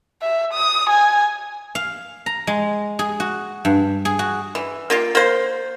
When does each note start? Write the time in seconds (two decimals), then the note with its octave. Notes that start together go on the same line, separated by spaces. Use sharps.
0.22 E5
0.53 D#6
0.90 G#5
1.75 F5
2.26 A#5
2.47 G#3
2.99 G#4
3.20 F#4
3.65 G2
4.05 G#4
4.19 F#4
4.55 E3
4.90 A#3 F4 G4
5.15 A#3 C5